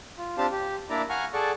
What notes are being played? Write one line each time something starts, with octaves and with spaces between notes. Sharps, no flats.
F4
C4 D4 F4 G4 F5 A5
G4
A#3 D4 E4 D5 A#5
F5 F#5 G#5 A#5 C#6 F6
G#4 A4 D5 F#5 C#6